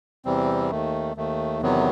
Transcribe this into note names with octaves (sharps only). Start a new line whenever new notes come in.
E2 C3 E3 G3 C4
D#2 D#3 A3
D#2 D#3 A3
E2 C3 D#3 F#3 B3